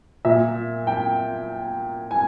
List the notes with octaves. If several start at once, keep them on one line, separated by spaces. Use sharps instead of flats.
A#2 E5
G5
G#5